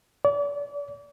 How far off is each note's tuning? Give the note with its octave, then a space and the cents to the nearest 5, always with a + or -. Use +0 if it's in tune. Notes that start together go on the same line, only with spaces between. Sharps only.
D5 -35